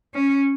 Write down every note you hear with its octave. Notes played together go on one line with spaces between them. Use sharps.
C#4